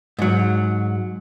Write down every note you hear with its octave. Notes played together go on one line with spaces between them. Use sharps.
G#2 F#3